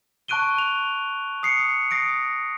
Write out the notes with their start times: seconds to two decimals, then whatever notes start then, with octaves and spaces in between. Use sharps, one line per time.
0.28 A5 C#6 F#6 D7 D#7 G7
0.58 F7
1.43 D#6 C7 C#7
1.91 D#6 A#6 C7 D7